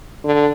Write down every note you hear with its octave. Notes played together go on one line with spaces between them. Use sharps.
D3